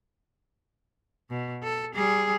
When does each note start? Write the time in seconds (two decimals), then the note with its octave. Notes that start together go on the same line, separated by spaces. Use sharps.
1.30 B2
1.63 A4
1.94 G3 G#4